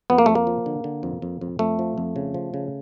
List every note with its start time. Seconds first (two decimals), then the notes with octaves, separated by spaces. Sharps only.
0.10 F2 B3
0.18 A#3
0.26 F2 A3
0.35 A#3
0.47 F3
0.66 D3
0.84 D3
1.03 F2
1.22 F2
1.41 F2
1.59 F2 A3
1.79 F3
1.98 F2
2.16 C#3
2.34 F3
2.54 C#3